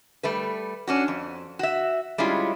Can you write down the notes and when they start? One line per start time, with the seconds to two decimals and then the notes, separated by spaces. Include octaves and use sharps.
0.23 G3 A3 B4
0.87 C#4 D4 F#4
1.08 F2
1.59 F#4 E5
2.18 G3 G#3 C#4 E4 F4